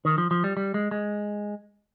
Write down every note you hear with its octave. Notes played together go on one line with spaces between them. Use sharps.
D#3
F3
F3
G3
G3
G#3
G#3